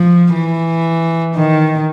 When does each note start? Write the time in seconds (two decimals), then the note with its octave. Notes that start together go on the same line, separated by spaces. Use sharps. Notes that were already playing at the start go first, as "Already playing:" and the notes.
Already playing: F3
0.34 E3
1.35 D#3